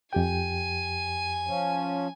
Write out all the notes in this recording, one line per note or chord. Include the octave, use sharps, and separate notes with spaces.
F2 G4 G5 G#5
F3 C#4